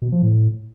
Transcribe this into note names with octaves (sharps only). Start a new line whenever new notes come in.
B2
F3
A2